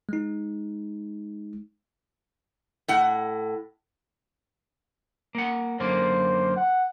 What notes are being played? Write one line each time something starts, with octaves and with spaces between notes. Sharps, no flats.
G#3 D#4
A2 F#5
A#3 F#5
F#2 D3 A#3 C5
F#5